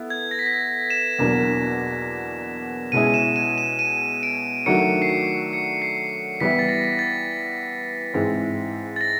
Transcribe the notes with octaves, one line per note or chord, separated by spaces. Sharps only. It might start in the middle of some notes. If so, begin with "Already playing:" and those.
Already playing: B3 E4 A4
G#6
A#6
B6
A#6
E7
E2 B2 F#3 A#3 D4
B2 G#3 C#4 E4 G#4 D#7
E7
D#7
E7
D#7
D7
D#3 F#3 A3 D4 F#4 C#7
C7
C#7
C#7
C7
E3 G3 B3 E4 B6
A6
A#6
A6
G#2 E3 G#3 C4 E4
A6
A#6